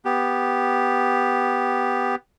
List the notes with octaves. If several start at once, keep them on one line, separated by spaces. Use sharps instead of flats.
B3 G4